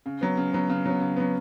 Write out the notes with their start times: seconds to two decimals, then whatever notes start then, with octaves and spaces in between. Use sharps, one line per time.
0.06 C#3
0.21 F#3 B3
0.37 C#3
0.53 F#3 B3
0.69 C#3
0.86 F#3 B3
1.01 C#3
1.16 F#3 B3